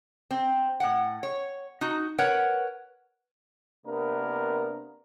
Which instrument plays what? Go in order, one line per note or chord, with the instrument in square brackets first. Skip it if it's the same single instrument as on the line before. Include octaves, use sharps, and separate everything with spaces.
[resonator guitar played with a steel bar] C4
A2 F#5
C#5
D#4 F#4
A#4 B4 C#5 F#5
[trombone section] C3 A#3 B3 D4 A#4